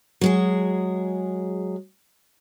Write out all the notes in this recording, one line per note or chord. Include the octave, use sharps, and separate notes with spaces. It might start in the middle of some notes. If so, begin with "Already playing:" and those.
F#3 G#3 G#4